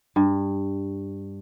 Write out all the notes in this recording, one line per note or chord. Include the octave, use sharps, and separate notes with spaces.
G2